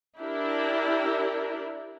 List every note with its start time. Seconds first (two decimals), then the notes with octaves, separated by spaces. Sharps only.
0.18 D4 E4 G4 A#4